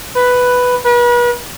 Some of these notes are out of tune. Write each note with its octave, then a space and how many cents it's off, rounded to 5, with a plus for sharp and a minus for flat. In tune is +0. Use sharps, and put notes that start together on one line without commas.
B4 +5
B4 -40